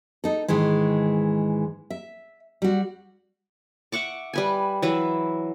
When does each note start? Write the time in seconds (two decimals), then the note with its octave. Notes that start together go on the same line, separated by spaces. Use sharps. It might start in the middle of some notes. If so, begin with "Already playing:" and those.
0.24 D#4 A4
0.48 G#2 D#3 E3 G#3
1.90 E5
2.62 G3 F#4
3.92 E5 F#5 C#6 D6
4.33 G3 B4 G#5
4.82 E3 F#3 B4 E5